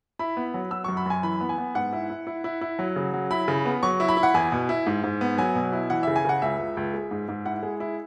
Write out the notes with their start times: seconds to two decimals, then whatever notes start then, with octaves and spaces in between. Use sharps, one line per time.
0.19 E4 B5
0.37 B3
0.54 F#3
0.71 F#3 E6
0.84 F#2 C#6
0.97 B5
1.06 F#2 G#5
1.23 E3 B5
1.41 B3
1.49 G#5
1.58 B3
1.75 G#2 F#5
1.93 E4
2.10 E4
2.27 E4
2.44 E4
2.61 E4
2.79 F#3
2.96 C#3
3.14 F#3
3.31 E4 B5
3.48 C#3
3.65 B3
3.83 F#3 C#6
4.00 E4
4.09 B5
4.17 E4
4.23 F#5
4.34 E2 G#5
4.52 B2
4.69 E4
4.87 G#2
5.04 G#2
5.21 B3
5.38 F#3 G#5
5.55 B2
5.73 E4
5.90 E3 F#5
6.03 C#3 E5
6.16 G#5
6.25 C#3 F#5
6.42 C#2 E5
6.59 C#2
6.77 C#2
6.94 G#3
7.11 G#2
7.29 G#2
7.46 E4 F#5
7.63 G#3
7.80 E4